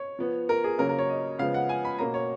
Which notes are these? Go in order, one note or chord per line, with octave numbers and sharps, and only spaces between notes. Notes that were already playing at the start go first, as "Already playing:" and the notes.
Already playing: C#5
F3 B3
A#4
G#4
C#3 F#3 A#3 C#4 A#4
A#4
C#5
D#5
C#3 F3 G#3 B3 F5
F#5
G#5
B5
B2 A#3 C#4 A#5
C#5